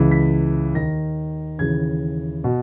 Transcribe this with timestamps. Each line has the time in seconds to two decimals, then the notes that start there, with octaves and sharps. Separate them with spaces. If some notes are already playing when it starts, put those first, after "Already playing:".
Already playing: C#2 C#3 E3
0.11 B6
0.75 D#2 D#3 A#6
1.59 D#2 C#3 E3 G#6
2.44 B2